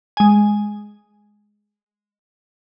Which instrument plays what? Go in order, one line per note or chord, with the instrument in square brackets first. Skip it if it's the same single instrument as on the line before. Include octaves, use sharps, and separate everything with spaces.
[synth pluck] G#3 G#5